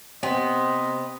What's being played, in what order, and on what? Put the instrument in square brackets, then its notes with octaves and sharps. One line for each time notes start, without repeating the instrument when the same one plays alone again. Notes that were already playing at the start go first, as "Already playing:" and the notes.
[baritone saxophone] C3 [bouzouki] B3 [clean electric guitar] C4 [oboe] D#5